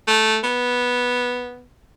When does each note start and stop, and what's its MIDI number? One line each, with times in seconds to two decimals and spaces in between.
0.07 0.38 57
0.43 1.66 59